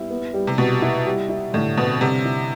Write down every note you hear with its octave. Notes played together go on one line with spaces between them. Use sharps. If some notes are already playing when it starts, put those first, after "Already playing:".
Already playing: G3 B3 E4
B3
G3
C3
B2 G3
E4
G3
E4
A2 D3
B2 C4
C3 G3
E4